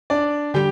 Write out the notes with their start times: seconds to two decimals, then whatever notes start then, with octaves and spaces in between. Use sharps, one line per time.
0.10 D4 D5
0.54 D3 G3 G4 G5